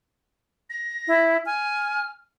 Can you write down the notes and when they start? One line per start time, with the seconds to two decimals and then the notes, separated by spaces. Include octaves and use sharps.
0.70 A#6
1.08 E4
1.46 G#5 F6